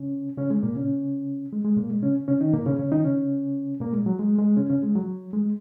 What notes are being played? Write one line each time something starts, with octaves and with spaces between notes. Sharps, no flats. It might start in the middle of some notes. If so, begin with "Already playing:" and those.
Already playing: C#3 C#4
C#3 C#4
G#3
A#2 A#3
C#3 C#4
G#3
G#3
A#2 A#3
G#3
C#3 C#4
C#3 C#4
D#3 D#4
A#2 A#3
C#3 C#4
C#3 C#4
D#3 D#4
C#3 C#4
A#2 A#3
G#3
F#3
G#3
G#3
C#3 C#4
C#3 C#4
G#3
F#3
G#3